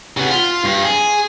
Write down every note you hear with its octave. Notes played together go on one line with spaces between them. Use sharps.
C#3 B3
F4
G2
G#4